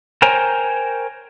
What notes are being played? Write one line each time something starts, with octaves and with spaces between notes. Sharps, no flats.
A#4 C5 C#5 G5 G#5 A#5